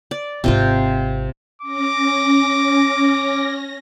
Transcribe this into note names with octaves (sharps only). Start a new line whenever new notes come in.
D5
G#1 C3 C4 F4 C5
C#4 D6 A#6